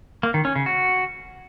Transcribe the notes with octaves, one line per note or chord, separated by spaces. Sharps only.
A#3
D#3
C#4
C#3
F#4